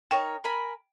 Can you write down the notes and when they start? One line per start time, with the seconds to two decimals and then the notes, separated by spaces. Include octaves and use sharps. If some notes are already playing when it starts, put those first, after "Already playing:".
0.11 D#4 A#4 C#5 G5
0.44 A#4 G#5 B5